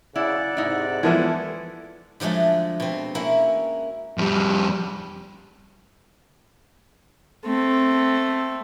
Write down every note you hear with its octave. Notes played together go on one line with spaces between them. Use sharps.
B1 C#3 E4 D5 F#5
G#2 C3 D#4 E4
E3 F3 G#3 A3 B3 E4
D3 F3 F#3 G#3 A3
B2 C4
A#3 C#4 E4 F#4
F2 G3
A3 C4